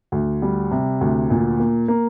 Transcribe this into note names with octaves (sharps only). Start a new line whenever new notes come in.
D2
G3
C3
D2
A#2
A#3
A#3